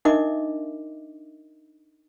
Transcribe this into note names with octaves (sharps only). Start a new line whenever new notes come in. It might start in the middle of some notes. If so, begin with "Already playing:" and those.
D4 D#4 A#4 D#5 E5 D6